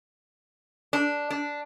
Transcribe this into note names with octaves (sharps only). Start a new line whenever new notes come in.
D4
D4